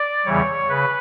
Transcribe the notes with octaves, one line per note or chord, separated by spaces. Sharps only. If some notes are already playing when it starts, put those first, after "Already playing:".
Already playing: D5
E2 C#3 E3 G3 C#5
C#3 B4